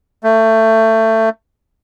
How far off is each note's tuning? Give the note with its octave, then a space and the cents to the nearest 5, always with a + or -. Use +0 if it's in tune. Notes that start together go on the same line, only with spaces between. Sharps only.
A3 +20